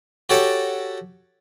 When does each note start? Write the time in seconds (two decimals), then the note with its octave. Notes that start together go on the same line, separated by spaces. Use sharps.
0.29 F#4 G4 A4 C#5 G5 A5